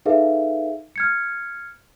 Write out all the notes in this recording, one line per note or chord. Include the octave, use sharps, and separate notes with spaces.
D#4 G#4 A4 B4 E5 F5
F6 G#6 C#7